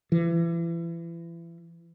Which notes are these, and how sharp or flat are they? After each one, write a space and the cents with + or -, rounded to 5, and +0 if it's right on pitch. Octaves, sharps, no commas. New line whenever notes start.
E3 +35